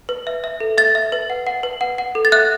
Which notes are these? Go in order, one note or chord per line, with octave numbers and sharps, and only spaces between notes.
B4
E5
E5
A4
E5 A6
E5
B4
F#5
F#5
B4
F#5
F#5
A4
A6
E5 F#6